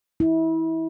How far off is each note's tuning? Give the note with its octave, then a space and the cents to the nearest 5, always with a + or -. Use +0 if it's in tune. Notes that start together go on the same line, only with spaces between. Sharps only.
E4 -30